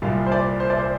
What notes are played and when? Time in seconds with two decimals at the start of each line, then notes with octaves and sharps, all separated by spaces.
0.02 C2 A#2 G3 F5
0.26 C5
0.32 D5
0.60 C5
0.70 D5
0.79 C5